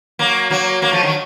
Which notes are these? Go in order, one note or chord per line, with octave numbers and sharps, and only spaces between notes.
F#3 A#3
F#3 A#3
F#3 A#3
F3 A3
D#3 F#3